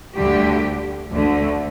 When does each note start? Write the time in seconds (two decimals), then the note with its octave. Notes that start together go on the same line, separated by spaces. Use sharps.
0.16 D2 D3 G3 G4
1.12 D2 D3 A3